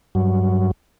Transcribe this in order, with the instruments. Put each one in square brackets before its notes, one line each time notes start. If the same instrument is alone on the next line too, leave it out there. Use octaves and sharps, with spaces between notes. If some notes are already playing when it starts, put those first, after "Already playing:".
[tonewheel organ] G2 F#3